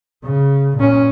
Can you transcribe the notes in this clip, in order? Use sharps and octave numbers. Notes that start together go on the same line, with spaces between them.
C#3
A#2 C#4